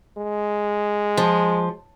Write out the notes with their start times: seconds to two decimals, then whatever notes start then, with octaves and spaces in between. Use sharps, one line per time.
0.18 G#3
1.17 F3